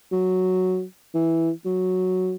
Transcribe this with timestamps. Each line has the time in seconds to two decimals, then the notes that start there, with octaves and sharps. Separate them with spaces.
0.12 F#3
1.14 E3
1.65 F#3